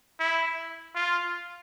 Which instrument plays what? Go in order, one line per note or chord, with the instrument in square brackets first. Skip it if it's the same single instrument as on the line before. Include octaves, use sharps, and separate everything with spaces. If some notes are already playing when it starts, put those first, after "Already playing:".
[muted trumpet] E4
F4